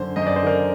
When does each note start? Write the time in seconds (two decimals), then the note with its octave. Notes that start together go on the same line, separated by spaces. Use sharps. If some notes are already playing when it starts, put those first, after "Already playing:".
Already playing: F#2 D3 C5
0.16 F#2 D#5
0.27 D5
0.36 C5
0.43 D3 A#4 D5